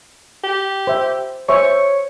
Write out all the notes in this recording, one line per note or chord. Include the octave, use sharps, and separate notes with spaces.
G4
C5 E5
C5 C#5 E5 C#6